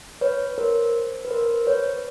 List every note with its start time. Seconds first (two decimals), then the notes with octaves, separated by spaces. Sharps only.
0.21 B4 C#5
0.58 A#4 C5
1.25 B4
1.31 A#4 C5
1.67 B4 C#5